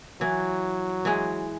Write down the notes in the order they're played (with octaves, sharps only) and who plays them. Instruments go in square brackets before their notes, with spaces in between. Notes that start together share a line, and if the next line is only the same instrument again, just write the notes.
[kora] E3 [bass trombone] F#3
[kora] E3 G#3